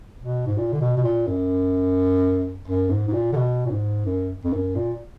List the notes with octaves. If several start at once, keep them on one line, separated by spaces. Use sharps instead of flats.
B2
G#2
A#2
D3
B2
B2
A#2
F#2
F#2
G#2
G#2
A#2
D3
B2
A#2
G#2
F#2
F2
F#2
A#2